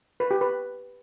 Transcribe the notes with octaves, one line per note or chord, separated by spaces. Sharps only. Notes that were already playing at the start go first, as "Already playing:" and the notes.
B4
G4
B4